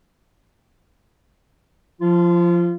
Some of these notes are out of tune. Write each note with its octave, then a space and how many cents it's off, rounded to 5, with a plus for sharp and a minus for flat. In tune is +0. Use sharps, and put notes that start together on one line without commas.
F3 +0 F4 -25